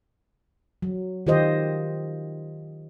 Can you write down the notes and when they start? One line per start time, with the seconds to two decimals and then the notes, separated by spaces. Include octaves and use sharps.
0.82 F#3
1.27 D#3 F4 G4 C5 D#5